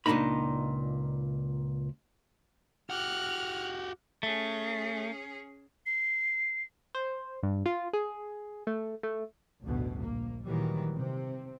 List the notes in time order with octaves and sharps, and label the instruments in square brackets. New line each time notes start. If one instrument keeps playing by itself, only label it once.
[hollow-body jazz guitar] C#2 A#2 D#3 D4 D#4 B5
[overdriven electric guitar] F#4 G4 [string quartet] F6 F#6
[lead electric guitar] A3 [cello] C#4 G#4
[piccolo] C7
[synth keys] C5
G2
F4
G#4
A3
A3
[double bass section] A1 D2 G2 B2
A#1 A#3
A#2 D#3 E3 F#3 G3
C3 C4